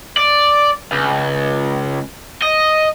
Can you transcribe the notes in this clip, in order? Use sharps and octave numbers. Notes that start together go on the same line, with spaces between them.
D5
C#2
D#5